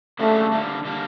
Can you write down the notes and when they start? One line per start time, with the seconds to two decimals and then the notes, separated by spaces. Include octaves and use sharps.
0.19 C#3 F#3 A3 A#3 D4 G4
0.52 D3 G3 A#3
0.85 D3 G3 A#3